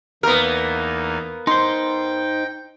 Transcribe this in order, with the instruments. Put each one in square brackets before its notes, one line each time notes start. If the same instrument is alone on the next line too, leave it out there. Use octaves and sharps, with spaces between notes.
[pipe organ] E2 A#3 D#4 [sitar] B3 A#4 [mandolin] F5
[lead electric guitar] D#4 C5 [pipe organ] G5 [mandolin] C6